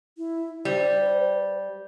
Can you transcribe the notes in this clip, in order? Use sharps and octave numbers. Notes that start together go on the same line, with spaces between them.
E4
G3 C5